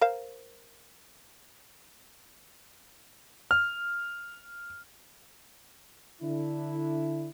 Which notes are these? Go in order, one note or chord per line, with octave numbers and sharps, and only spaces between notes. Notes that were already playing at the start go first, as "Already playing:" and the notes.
A#4 C5 F5
F6
D3 D4 E4